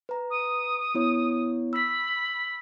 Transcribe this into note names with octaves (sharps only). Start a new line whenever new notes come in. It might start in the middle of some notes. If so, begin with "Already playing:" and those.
B4 A#5
D#6
B3 E4 C#5
B5 E6 B6